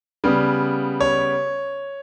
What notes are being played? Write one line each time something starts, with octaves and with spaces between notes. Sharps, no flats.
C#3 G3 B3
C#5